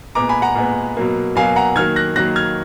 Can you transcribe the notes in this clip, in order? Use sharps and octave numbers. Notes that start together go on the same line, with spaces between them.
A#2 G#3 B3 A#5 D6
G#5 B5
F#5 A#5
A#2 G#3 B3
B2 F#3 A#3
B2 F#3 A#3 F5 G#5
F#5 A#5
D#3 F#3 A#3 F6 G#6
F#6 A#6
D#3 F#3 A#3 F#6 A#6
F6 G#6